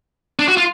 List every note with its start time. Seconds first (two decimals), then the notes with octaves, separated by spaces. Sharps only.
0.39 D4
0.48 F#4
0.57 F4